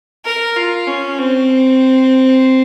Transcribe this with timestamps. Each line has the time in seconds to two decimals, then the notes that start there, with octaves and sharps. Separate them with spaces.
0.25 A#4
0.57 F4
0.87 C#4
1.18 C4